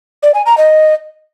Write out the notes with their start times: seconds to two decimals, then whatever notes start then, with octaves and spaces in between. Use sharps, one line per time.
0.23 D5
0.34 G#5
0.46 A#5
0.58 D#5